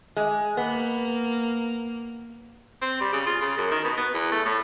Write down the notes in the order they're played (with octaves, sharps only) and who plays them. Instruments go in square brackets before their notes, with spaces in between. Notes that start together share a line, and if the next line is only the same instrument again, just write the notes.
[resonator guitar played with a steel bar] G#3
[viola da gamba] A#3 [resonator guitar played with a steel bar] B3
[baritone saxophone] C4
G3
C#3
F4
C#3
F#2
D#3
B2
B3
E2
A3
A2